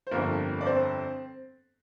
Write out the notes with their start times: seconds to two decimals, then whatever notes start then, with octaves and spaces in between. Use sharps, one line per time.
0.07 C5
0.12 G1 F2 D3 G3 A#3 A#4
0.61 D5
0.66 C4 C5